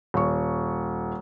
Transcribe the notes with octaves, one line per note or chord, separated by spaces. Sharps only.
D#1 C#6